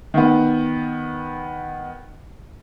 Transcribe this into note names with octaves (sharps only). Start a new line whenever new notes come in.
D#3 B3